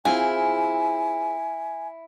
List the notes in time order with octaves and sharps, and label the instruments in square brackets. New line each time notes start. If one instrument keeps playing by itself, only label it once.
[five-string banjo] C4 F4 G#4 [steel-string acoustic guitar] E4 [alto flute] G#5